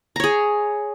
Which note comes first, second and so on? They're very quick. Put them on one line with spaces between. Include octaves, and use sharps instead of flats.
A#5 C#5 G#4